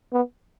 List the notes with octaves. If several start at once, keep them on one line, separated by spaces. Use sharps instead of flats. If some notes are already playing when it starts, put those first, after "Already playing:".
B3